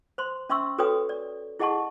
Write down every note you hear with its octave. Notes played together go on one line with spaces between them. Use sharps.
C5 C6
C#4 E5 C6 C#6 E6
F#4 A4 B4 C#5 G5 D#6
D5
E4 G#4 D#5 F#5 A5 C#6